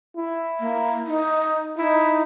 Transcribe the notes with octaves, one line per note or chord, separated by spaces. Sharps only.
E4
A#3
D#4
D#4 E4